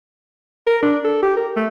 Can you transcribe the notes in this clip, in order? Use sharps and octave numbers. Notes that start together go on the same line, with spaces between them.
A#4
D4
A4
G4
A#4
A3